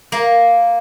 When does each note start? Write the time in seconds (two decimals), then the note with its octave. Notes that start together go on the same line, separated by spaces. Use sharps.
0.12 A#3